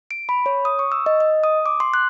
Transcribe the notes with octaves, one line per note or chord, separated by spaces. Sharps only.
D7
B5
C#5
D#6
C#6
E6
D#5
D#5
D#6
D6
C6
F#6